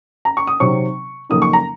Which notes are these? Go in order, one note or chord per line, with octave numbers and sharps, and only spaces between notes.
A#5
C#6
D#6
C3 D#3 F#3 C4 C#6
F2 C#3 F#3 A#3 D#4 D#6
C#6
A#5